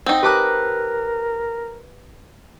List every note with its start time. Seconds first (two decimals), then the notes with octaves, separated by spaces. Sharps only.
0.06 C4 D#4 F#5
0.23 G4 A#4 B4 A5 A#5 D6 F#6